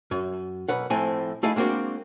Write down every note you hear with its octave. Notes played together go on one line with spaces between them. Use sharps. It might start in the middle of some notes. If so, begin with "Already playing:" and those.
F#2
B1 B4 F#5
A2 F3 A3 C4 E4 G#5
A3 D#4 E4 G#4 F5
G#3 A#3 C4 D4 F#4